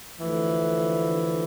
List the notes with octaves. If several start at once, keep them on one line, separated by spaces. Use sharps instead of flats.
D2 D3 E3 F3 A3